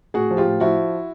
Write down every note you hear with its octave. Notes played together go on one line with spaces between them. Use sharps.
A2 F#4 G#4
F3
F4 G4
A2
F3 E4 F#4